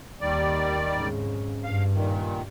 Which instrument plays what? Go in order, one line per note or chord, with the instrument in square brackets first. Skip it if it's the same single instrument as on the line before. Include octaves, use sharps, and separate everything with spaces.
[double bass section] D#2 [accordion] D#3 G3 D5
[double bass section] F2 G#2 C#3
[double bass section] G2 [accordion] F5
[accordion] A#2 D#3